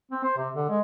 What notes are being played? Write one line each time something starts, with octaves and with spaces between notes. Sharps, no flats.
C4
C5
C3
D3
G#3